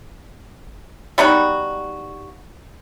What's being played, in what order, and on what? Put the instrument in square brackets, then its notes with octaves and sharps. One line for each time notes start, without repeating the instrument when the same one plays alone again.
[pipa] G3 B3 D#4 F#4